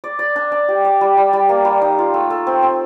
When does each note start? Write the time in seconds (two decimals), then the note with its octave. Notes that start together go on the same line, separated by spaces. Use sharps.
0.04 D5
0.19 D5
0.36 D4
0.52 D4
0.68 G4
0.85 D5
1.01 G3
1.17 G3
1.33 G3
1.49 A#3
1.65 G3
1.82 D#4
1.98 F4
2.14 A3
2.30 A3
2.47 C4
2.62 C4